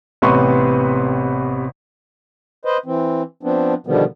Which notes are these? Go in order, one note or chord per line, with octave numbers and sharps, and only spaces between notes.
A1 C3 B3 B4 C6 C#6
B4 C5 D#5
E3 C4
F3 B3 C4 D4
B2 D3 D#3 F3 G3 B3